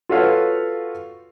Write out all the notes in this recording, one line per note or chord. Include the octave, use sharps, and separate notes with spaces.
F4 F#4 A4 B4 C#5 F5